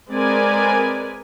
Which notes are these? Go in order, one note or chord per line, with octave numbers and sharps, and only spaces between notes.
G#3 C4 A#4 B4 D5 G#5